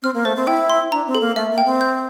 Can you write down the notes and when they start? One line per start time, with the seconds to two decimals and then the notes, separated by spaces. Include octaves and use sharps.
0.03 C4 F6
0.14 A#3
0.25 A3 C5
0.36 C4
0.47 E4 G5
0.70 C6
0.91 D4 A#5
1.07 C4
1.15 A4
1.21 A#3
1.36 A3 E5
1.51 A#3
1.58 G5
1.66 C4
1.81 G6